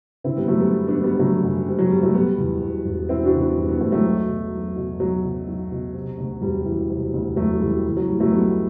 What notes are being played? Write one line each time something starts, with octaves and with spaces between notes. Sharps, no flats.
D3 C4 E4
G3 B3
F#2 F#3 A3
G3 B3
F#1
B3 D4
F#1
G3 B3
D3 F#3 A3
F#2 G3
F#1 G3
F#3
F#1 G3
F#3 A3
B2 G3 B3
E2
E1
E1
B2 C4 E4
D4 F#4
E2
B3 D4
E1 G3 B3
B3 D4
E1 A3 C4
F#3 A3
B1
B2
B1
B2
B1 F#3
B2
B1
B2
C3
D2
E1 G3
E3
C3
D2
E1 F#3 A3
E3 G3
E3
F#3
A2 G3
F#3 A3
B1 G3 B3